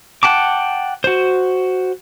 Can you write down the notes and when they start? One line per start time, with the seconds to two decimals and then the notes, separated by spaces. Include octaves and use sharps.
0.23 F#5 G5 A5 D6
1.04 F#4 C5